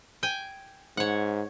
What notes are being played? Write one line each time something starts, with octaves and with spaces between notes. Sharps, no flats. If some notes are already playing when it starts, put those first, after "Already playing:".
G5 G#5
G#2 C#5 F#5